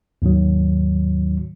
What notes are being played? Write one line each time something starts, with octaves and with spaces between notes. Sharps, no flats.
D#2 G#2 D#3 F#3